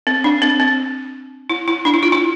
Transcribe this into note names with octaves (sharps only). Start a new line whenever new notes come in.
C4
D4
C4
C4
E4
E4
D4
E4
F4
E4